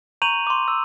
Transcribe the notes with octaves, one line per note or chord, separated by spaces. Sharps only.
A#5 C#6 G6 D#7 F7 F#7
C6 D6
E6